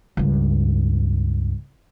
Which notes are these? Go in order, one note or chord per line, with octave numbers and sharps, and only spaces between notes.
C#2 G2